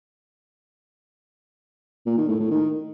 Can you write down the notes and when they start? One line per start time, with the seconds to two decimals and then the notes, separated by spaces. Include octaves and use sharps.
2.07 A#2
2.18 D#3
2.29 A2
2.40 A2
2.51 D#3